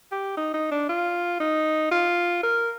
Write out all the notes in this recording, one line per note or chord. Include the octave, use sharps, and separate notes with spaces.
G4
D#4
D#4
D4
F4
D#4
F4
A#4